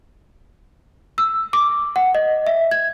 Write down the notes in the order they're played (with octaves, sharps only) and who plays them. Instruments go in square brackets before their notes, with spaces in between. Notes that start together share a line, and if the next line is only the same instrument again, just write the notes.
[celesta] E6
D6
F#5
D#5
E5
G#6